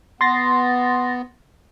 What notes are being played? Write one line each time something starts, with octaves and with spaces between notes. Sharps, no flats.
B3 C6 A6 A#6